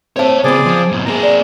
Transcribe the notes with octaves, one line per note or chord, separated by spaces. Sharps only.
C4 C#5 E5 A5
C#3 B3 C4 G#4 C5 D5
F3
G#2 B2
A#3 G#4 A#5
D5